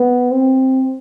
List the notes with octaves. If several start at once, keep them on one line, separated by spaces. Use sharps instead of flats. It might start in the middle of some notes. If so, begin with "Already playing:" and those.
Already playing: B3
C4